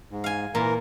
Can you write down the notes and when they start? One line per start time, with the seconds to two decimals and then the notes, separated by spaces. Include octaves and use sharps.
0.11 G#2
0.24 F5 G#5
0.55 A#2 E3 A#4